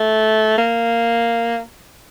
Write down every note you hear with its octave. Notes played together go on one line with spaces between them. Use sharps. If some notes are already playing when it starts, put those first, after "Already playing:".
Already playing: A3
A#3